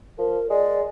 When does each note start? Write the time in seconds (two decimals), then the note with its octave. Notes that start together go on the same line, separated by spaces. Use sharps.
0.19 F3 A#4
0.50 G#3 D5